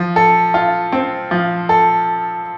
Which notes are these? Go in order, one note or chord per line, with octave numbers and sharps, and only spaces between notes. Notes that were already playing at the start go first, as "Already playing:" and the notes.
Already playing: F3
A4
F4
C4
F3
A4